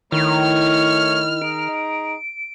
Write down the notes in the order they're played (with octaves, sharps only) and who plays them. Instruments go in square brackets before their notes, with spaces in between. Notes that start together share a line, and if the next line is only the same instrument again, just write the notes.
[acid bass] D#3 [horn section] A3 C#5 [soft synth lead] E4 [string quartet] F6
[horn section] D#4 G#4 A#5 [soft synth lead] D7